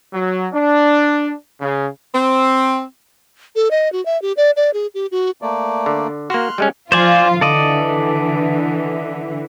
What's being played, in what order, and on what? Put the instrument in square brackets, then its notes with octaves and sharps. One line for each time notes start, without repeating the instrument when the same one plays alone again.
[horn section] F#3
D4
C#3
[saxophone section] C4
[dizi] A4
D#5
F#4
E5
G4
D5
D5
G#4
G4
F#4
[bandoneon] A3 A#3 D5
[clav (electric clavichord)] D3
[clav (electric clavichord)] A#3 F#4 [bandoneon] C6 F6 F#6
[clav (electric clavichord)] G3 G#3 C#4
[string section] F3 F4 [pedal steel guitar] C5 D5 G#5
[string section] D3 E3 [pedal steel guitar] A4 D5 D#5